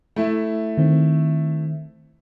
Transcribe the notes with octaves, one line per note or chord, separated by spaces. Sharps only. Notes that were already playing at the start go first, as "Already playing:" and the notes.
A3 E4
D#3 C4